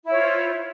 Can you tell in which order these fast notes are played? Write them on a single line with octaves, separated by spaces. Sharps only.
E4 C#5 F4 C5